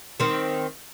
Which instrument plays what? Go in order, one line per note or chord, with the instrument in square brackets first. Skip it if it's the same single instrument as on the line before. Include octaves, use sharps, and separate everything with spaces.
[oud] D#3 C4